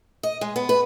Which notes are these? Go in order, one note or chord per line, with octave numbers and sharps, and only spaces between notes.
D#5
G#3
B3
B4